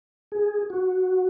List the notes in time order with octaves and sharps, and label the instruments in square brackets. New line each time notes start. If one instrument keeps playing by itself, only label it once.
[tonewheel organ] G#4
F#4